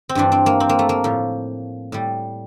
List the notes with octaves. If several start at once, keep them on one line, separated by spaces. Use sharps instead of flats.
C4
G2 E3 G3 D4
C4
A#3
C4
A#3
A3
A#3
A2 F3
A2 G3